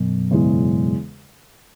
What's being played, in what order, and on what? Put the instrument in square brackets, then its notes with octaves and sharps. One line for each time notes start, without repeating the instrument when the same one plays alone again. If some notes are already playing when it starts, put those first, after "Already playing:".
Already playing: [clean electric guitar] F#2 B2
[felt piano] E2 C#3 G#3 E4 G#4